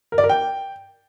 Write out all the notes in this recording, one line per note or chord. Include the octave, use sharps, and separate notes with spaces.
A#4
D5
A#4
G5